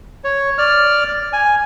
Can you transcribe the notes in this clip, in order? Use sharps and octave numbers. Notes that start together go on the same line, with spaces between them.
C#5
D5 F6
G#5